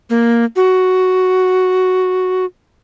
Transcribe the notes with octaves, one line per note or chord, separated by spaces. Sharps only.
A#3
F#4